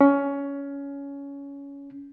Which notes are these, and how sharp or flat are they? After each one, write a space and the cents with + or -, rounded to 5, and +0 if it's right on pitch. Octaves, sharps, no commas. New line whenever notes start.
C#4 +20